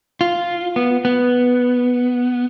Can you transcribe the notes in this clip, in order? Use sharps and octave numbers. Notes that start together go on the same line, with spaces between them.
F4
B3
B3